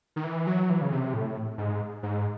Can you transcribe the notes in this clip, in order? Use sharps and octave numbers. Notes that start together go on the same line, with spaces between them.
D#3
E3
F#3
E3
C#3
C3
A2
G#2
G#2